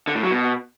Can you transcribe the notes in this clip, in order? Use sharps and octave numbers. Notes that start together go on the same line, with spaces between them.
D3
A2
F#3
B2